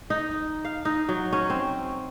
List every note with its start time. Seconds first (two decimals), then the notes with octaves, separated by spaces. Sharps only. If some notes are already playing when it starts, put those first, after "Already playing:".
0.10 D#4
0.65 F5
0.85 D#4
1.09 F#3
1.32 C#4
1.50 C4